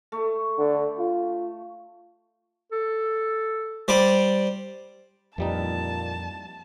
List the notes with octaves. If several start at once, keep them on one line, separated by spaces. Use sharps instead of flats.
A3
D3
F4
A4
G3 C5 D5
F2 A#2 E3 G3 D#4 A5